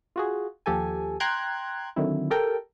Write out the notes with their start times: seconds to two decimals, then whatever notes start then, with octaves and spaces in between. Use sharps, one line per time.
0.16 F4 F#4 G#4
0.66 D#2 F3 G4 A4 G#5
1.20 G5 A#5 C6 F#6 G#6
1.96 D3 D#3 F#3 C4 E4
2.30 G4 A4 A#4 G5